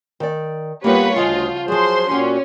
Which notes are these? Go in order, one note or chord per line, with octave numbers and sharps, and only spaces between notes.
D#3 D5
G3 A#3 B3 F4 G4 B4 C#5
D2 C#3 F3 F4 D#5 F#5
F3 F#3 G#4 C5 C6
A#2 C#4 F#4 G4